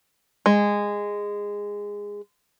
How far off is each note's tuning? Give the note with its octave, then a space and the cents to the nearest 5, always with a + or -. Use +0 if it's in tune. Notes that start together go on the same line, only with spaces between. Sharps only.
G#3 -15